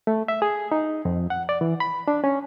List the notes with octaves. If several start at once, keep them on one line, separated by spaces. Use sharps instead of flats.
A3
E5
G#4
D#4
F2
F#5
D5
E3
B5
D4
C#4